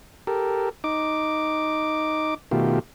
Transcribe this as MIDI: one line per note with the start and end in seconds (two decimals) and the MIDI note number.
0.27 0.69 67
0.27 0.69 69
0.27 0.69 70
0.84 2.34 63
0.84 2.34 86
2.51 2.79 47
2.51 2.79 51
2.51 2.79 57
2.51 2.79 65
2.51 2.79 67